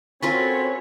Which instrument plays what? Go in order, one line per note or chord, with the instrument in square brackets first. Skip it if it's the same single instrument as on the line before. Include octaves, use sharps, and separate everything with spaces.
[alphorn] C4 [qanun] C#4 F4 A#4 [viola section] F#4 A4 C#5 [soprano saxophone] B5